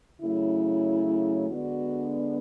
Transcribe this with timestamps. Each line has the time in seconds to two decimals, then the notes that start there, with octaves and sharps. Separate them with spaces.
0.21 C#3 F#3 A3 E4
1.48 D3 G#3 B3 D4 F#4